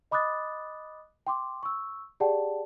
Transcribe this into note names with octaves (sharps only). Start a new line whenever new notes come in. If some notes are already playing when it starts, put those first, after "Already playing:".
D#5 B5 D6 D#6 F#6 A6
G5 C6 D6
C#6 E6
G4 G#4 D5 F#5 G5 A5